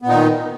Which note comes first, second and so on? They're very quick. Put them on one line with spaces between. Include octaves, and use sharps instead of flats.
B3 A#2 D#4 D#3